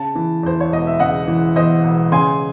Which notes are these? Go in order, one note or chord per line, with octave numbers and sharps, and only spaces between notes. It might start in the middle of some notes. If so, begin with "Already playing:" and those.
Already playing: C#3 A5
E3
E2 C5
C#5
E1 D#5
E5
C#3 D#5 F#5
E3
E2 C5 D#5
E1
C#3 G#5 C6